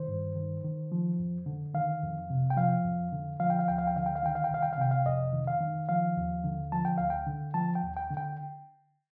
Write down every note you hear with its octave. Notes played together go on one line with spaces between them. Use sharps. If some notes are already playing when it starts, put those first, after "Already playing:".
Already playing: D#3 C5
G2
D#3
D#3
F3
F2
D3
D#3 F5
F2
C3
G5
F3 F5
F2
D3
F3 F5
G5
F5
D2 G5
F5
G5
D3 F5
G5
F5
D#3 G5
F5
G5
C2 F5
G5
F5
C3 G5
F5
F2 D#5
D#3
F5
D#3
F3 F5
D#2
D3
F3 A5
G5
D2 F5
G5
D3
F3 A5
G5
D#2
G5
D3
G5